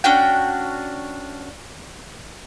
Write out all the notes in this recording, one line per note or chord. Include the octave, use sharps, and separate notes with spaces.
C#4 D4 F#4 G5